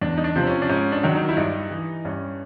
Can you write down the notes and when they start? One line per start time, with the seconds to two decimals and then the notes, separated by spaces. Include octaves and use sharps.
0.02 E2 D4
0.17 D#4
0.24 D4
0.35 C3 F3 C4
0.47 C#4
0.62 D4
0.69 G#2 C#4
0.92 D4
1.03 D#3 F#3
1.15 D#4
1.29 E4
1.37 G2 D#4
1.71 E3
2.05 G2 C#4